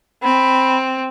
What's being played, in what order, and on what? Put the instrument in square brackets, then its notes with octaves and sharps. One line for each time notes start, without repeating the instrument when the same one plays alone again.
[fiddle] C4 [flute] B5